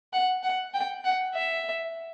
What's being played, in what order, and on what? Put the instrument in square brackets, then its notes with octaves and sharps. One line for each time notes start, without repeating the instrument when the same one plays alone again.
[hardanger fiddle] F#5
F#5
G5
F#5
E5